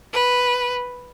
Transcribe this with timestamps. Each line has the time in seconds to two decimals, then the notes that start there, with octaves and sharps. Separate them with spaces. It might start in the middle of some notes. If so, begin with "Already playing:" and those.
0.13 B4